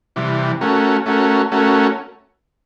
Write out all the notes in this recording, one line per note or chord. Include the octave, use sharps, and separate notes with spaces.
C3 E3 G3
A3 C#4 F#4 A#4
A3 C#4 F#4 A#4
A3 C#4 F#4 A#4